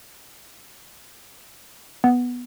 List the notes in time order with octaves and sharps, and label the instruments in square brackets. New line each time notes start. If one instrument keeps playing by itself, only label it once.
[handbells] B3